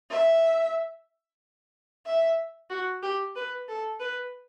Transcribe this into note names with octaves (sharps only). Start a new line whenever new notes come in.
E5
E5
F#4
G4
B4
A4
B4